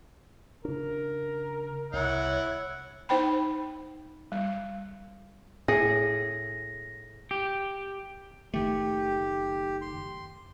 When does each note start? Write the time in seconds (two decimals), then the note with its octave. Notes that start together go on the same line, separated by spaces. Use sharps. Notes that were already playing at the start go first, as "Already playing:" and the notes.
0.65 C#3 D4 A#4
1.93 C2 E4 C#5 F#5
3.09 D#4 C5 G5 B5
4.32 G3
5.68 A2 G#4 A#6
7.31 G4
8.54 F#1 D#3 A3 G4
9.81 C6